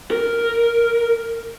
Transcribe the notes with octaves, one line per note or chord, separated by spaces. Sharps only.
A#4